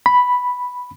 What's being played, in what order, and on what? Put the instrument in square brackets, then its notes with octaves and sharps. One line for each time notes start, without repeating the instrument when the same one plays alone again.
[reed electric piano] B5